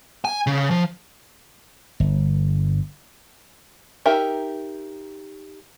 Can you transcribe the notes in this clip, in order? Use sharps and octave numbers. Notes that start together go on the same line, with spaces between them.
G#5
C#3
F3
G1
D#4 G4 A#4 E5